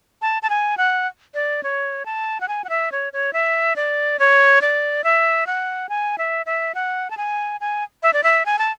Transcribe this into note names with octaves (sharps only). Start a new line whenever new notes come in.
A5
A5
G#5
F#5
D5
C#5
A5
F#5
G#5
F#5
E5
C#5
C#5
E5
D5
C#5
D5
E5
F#5
G#5
E5
E5
F#5
A5
G#5
G#5
E5
D5
E5
G#5
A5